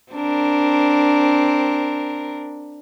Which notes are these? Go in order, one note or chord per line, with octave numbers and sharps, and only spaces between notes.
C4 D4 A#4